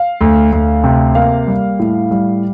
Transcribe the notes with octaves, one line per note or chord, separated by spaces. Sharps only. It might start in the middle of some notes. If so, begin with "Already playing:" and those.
Already playing: F5
D2
D2
C3
A#3 F5
G3
A2
G3